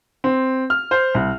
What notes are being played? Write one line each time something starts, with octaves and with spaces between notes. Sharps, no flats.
C4
F6
C5
C2